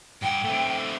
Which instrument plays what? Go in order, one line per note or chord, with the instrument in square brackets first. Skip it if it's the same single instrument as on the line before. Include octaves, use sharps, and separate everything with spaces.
[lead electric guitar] G2 F#5 [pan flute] G5
[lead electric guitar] A3 C4